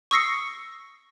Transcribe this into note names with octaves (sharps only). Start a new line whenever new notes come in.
C#6 D#6 E6 A#6 C7 C#7